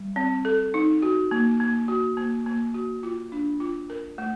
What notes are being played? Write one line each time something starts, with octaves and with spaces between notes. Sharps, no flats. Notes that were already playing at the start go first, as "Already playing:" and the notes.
Already playing: G3
C4
A4
D#4
F#4
A#3
A#3
F#4
A#3
A#3
F#4
F4
D4
F4
A#4
A3